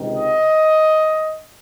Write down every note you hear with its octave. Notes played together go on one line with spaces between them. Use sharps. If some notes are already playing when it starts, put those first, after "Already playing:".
Already playing: C#2 C3 D#3
D#5